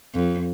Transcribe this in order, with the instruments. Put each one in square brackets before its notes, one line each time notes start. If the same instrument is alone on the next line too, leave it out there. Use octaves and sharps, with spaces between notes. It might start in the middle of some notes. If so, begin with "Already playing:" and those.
[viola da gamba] F2